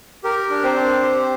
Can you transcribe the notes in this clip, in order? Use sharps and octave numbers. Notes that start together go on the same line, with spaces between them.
G4 A#4
D4
C4 C5
D4
G4